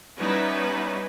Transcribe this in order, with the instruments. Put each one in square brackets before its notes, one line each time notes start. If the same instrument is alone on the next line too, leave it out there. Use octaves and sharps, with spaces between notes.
[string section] G3 B3 C#4 D#4 E4 B4